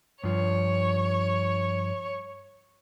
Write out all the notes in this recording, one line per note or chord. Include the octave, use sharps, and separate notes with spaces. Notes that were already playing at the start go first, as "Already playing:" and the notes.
G2 F3 C#5